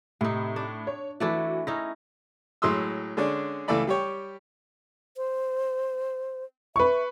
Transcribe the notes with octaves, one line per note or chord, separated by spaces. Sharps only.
A2 C3 D#4
D4
C#5
E3 A3 D4 E4 F#4
C#4 D#4 E4 A#6
A2 F#3 G#3 C6 D#6 E6
D3 G#3 C#4 D4
C#2 E3 A3 A4 D5 B5
G3 G4 C#5
C5
B4 E5 C#6